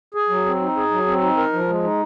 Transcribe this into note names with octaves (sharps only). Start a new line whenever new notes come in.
G#4
F#3
C4
D#4
G#4
F#3
C4
D#4
A#4
F3
G#3
D#4